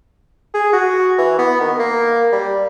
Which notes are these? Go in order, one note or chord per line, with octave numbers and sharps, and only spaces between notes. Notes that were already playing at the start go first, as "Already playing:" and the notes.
G#4
F#4
E3
B3
D#3
A#3
G3